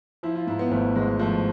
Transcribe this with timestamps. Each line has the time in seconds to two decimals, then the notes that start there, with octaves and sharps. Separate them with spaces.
0.23 F3 E4
0.35 F4
0.47 G#2 E4
0.59 B3
0.71 G#1 A3
0.96 G#1 G#3
1.19 F3 A3